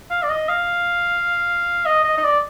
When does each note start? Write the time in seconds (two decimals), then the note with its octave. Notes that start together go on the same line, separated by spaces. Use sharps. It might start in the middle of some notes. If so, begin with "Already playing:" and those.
0.11 F5
0.23 D5
0.30 D#5
0.49 F5
1.86 D#5
2.04 D#5
2.17 D#5
2.24 D5